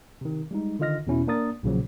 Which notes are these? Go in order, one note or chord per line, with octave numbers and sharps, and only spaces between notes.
C3 D#3
G3 G#3 D#4
D3 D#3 F4 D#5 F6 A#6
E2 B2 C#4 E4
A#3 D4 A#4 D#6 A6
B1 A#2 C#3 F3 F#3